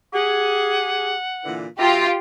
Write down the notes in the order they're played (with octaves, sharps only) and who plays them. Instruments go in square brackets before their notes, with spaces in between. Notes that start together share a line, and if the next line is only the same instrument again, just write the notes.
[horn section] G4 G#4 [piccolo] F#5
[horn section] A#2 D3 E3
[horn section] F#3 E5 A#5 [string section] F4 G4